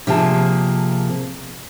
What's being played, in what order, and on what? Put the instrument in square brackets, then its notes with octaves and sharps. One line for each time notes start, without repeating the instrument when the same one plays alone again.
[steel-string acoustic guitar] C3 F3 A#3 G#4 F5 A5